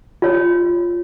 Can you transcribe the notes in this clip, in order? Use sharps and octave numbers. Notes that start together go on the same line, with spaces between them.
F4 C#5